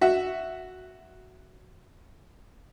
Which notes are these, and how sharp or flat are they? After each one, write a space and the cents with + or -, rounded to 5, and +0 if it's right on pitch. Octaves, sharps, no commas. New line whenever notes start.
F#4 +0 E5 +0